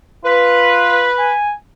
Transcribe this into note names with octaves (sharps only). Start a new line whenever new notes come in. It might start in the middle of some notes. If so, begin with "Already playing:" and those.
F4 B4
G#5